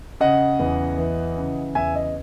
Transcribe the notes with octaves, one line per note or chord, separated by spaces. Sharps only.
C#3 D#5 F#5
E2
E3
C#3
E2 E5 G#5
D#5